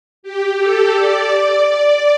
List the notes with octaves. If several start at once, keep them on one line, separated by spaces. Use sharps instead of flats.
G4
A4
D5
D5